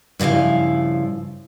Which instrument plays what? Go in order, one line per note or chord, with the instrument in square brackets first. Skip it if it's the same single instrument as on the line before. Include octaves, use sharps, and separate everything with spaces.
[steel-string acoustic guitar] G2 C#3 F3 E4 F5